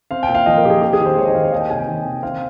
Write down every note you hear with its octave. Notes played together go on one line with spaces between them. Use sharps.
C4 F5
G5
A#2
F5
F3 D#5
A#4
A#2 G4
G#4
C4 G4
G#4
D#3
C5
G#3 C#5
D#5
D#3 F5
C#5
A#3 D#5
G5
C3 G#5
G5
D#3
C3
C4 F5